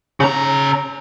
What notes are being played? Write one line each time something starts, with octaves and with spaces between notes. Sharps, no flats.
C#3 A#5